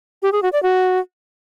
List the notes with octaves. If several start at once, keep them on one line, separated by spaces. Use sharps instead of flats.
G4
G#4
F#4
D5
F#4